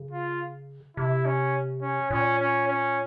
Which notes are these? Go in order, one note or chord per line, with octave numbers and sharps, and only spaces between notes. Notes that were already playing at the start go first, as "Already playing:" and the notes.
Already playing: C#3
F4
C3 E4
C#4
C#4
A#2 C#4
C#4
C#4